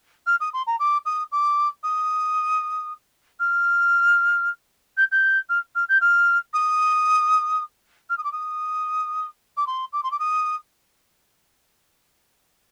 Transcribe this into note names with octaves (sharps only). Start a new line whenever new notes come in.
F6
D#6
C6
A#5
D6
D#6
D6
D#6
F6
G6
G6
F6
F6
G6
F6
D#6
F6
D#6
D6
D#6
D6
C6
D6
C6
D6
D#6